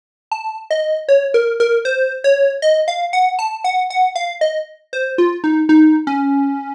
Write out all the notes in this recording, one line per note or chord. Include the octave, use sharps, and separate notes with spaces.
A5
D#5
C#5
A#4
A#4
C5
C#5
D#5
F5
F#5
A5
F#5
F#5
F5
D#5
C5
F4
D#4
D#4
C#4